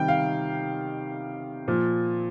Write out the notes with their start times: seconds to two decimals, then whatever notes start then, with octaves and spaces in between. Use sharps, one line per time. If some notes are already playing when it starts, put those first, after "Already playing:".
Already playing: C3 D#3 G3 G5
0.08 F5
1.68 A#2 F3